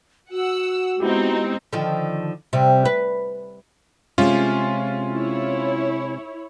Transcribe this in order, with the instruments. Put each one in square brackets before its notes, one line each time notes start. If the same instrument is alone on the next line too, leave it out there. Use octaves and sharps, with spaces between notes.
[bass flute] F#4 [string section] F#5 E6
[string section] G#3 C4 D#4 [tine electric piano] B3 E4 G4
[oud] D3 D#3 F3
C3 G3
B4
[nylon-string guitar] C3 G#3 [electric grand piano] C#4 F4
[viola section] E4 C#5